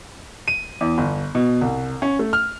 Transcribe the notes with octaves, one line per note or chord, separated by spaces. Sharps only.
D#7
E2
G1
B2
C2
C#4
A3
F6